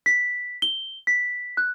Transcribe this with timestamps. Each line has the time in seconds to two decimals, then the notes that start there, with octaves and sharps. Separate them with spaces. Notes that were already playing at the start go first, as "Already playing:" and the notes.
0.06 B6
0.62 G7
1.07 B6
1.57 F#6